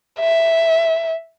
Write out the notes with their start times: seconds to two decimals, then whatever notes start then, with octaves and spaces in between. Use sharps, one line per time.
0.20 E5